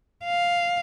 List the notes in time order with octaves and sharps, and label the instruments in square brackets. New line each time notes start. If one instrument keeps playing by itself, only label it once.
[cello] F5